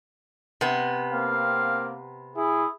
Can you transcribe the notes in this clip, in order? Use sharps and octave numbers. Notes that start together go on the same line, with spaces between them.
C3 B3
A#3 C4 F5
E4 G#4